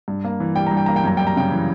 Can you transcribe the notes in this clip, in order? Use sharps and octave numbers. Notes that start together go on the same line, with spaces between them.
G2
A#3
E3
G3 G5
G2 A#5
G5
A#3 A#5
G5
F#2 A#5
G3 G5
A#5
C#3 G5
E3